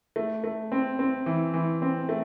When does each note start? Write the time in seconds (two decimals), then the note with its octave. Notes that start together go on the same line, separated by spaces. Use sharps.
0.16 A3
0.44 A3
0.72 C4
0.99 C4
1.26 E3
1.54 E3
1.82 C4
2.09 A3